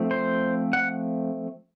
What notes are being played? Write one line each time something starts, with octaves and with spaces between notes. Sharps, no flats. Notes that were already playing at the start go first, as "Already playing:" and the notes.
Already playing: F3 A3 C4
C5
F#5